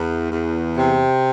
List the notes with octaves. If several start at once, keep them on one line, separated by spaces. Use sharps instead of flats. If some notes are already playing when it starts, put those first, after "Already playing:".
Already playing: E2
E2
C3